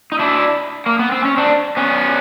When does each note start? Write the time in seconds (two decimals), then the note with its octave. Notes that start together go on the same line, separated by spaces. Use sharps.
0.12 D#4
0.19 D4 E4
0.86 A#3
0.99 B3
1.12 C4
1.25 C#4
1.37 C4 D4
1.77 B3 C#4